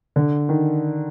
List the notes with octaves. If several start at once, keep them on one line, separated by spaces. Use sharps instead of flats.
D3
D#3